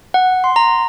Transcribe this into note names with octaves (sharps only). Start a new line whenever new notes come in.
F#5
C6
A#5